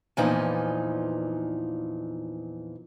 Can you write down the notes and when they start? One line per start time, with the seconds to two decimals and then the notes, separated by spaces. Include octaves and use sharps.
0.17 E2 A#2 E3 F3 D#4